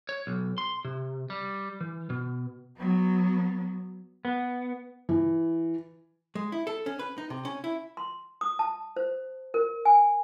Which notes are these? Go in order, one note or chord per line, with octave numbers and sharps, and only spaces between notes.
C#5
B1
C6
C3
G3
E3
B2
F#3 B3
B3
E3
G#3
E4
A4
C#4
B4
D#4
C3
C#4
E4
C6
D#6
A5
C5
A#4
G#5